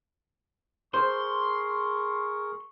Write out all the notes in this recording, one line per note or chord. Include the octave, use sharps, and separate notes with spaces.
G#4 A#4 C5 C6 C#6